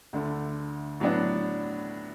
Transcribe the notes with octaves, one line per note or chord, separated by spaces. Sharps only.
D2 D3 A3
A2 F#3 B3 D4